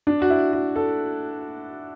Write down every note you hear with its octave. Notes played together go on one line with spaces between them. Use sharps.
D4
F#4
E4
F#4
A4